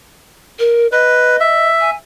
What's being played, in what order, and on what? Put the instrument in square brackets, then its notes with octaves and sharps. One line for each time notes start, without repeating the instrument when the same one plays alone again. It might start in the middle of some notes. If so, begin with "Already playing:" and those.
[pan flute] A#4
[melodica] B4 [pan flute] D#5
[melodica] E5
[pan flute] G#5